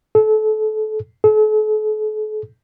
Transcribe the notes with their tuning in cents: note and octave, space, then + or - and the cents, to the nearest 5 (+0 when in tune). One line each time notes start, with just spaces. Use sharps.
A4 -30
A4 -45